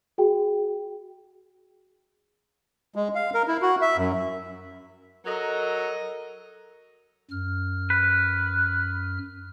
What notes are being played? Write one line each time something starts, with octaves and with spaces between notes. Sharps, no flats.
F#4 G#4 G5
G#3
F5
A#4
E4
F#4
E5
F#2
F#3 A4 A#4 D#5
F#2 F6
B4